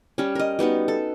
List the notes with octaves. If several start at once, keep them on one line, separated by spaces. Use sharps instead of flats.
G3 C#4
A#4 D#5
G3 B3 D#4 F#4
A4